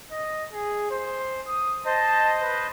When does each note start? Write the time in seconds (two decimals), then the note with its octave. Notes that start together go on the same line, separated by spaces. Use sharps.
0.11 D#5
0.52 G#4
0.90 C5
1.47 D#6
1.86 C5 D#5 A5
2.41 B4